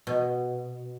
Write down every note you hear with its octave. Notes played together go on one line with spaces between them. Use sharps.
B2